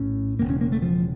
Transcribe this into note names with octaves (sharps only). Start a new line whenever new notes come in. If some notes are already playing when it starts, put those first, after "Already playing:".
Already playing: A#1 A2 C#4
E1 E2 C#3 A#3
C#4
A#3
A3
F3